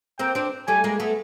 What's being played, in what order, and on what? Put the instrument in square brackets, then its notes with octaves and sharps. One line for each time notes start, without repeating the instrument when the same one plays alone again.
[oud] A#3 C4 [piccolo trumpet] G5
[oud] C4 D4
[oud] G3 A3 [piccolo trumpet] G#5
[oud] G#3 A#3
A3 B3